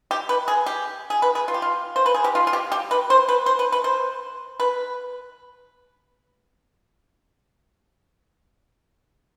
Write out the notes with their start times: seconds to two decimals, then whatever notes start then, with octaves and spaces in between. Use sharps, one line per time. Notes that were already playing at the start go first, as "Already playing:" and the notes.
0.11 G4
0.29 B4
0.48 G#4
0.66 G4
1.10 G#4
1.22 B4
1.35 G#4
1.48 F4
1.54 G4
1.62 F4
1.96 C5
2.06 B4
2.14 G#4
2.24 G4
2.35 F4
2.47 F4
2.53 G4
2.72 G4
2.91 B4
3.10 C5
3.29 B4
3.46 C5
3.59 B4
3.72 B4
3.84 C5
4.60 B4